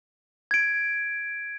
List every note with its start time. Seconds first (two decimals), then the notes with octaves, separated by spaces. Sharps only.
0.51 G#6 D7